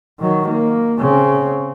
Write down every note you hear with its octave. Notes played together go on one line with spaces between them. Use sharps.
D#3 F#3
A#3
C#3 C4